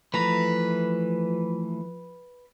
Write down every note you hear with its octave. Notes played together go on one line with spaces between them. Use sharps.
E3 F3 A3 B4 A#5